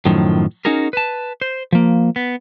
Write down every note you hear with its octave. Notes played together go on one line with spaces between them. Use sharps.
F#2 A2 D#3 F3 F#3
C#4 D#4 F#4 G#4 A#4
B4 A5
C5
F3 A#3
B3